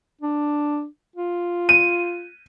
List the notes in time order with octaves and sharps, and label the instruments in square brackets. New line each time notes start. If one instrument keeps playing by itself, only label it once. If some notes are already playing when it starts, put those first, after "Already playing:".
[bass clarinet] D4
F4
[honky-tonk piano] D#7